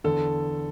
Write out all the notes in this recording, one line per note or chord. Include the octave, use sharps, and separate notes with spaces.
E2 D3 A4